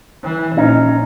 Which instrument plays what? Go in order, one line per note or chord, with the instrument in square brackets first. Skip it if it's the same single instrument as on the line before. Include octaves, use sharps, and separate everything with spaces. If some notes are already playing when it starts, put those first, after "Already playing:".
[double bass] E3
[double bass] A#1 [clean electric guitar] C#4 D#4